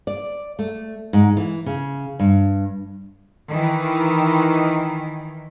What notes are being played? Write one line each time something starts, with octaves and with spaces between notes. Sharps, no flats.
D5
A3
G#2
E3
C#3
G2
D#3 E3